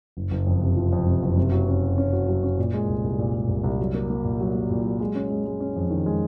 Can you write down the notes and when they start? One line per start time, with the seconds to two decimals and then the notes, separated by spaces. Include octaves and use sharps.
0.17 F#1
0.31 F#1
0.47 F2
0.62 C3
0.76 F3
0.93 F2
1.07 C3
1.23 F#1
1.37 C3
1.52 F#3
1.68 C#4
1.83 F#4
1.98 C#4
2.13 F#4
2.28 F#3
2.44 C#4
2.59 A#2
2.73 G#3
2.88 C2
3.04 C2
3.19 A#2
3.34 G#3
3.49 C2
3.64 C2
3.79 F#3
3.94 A#3
4.10 A#3
4.24 A#2
4.40 F#3
4.55 A#3
4.70 A#2
4.85 F#3
5.00 G#3
5.15 C#4
5.30 G#3
5.46 G#3
5.60 C#4
5.76 F2
5.90 D#3
6.06 G#3